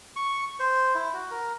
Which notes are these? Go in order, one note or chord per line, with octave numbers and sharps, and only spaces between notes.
C#6
C5
E4
F#4
A#4